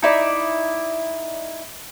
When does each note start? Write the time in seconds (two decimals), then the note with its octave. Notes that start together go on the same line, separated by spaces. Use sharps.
0.02 D#4 E4 D5